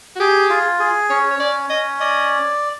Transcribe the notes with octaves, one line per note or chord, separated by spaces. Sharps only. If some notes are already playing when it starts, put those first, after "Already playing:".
F#4
G4 G#4
F4
G#4
C#4 C#5
C#5
C#4 D5
C#4 D#5
D5 D#5